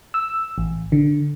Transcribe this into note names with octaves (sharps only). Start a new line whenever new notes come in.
E6
A1
D3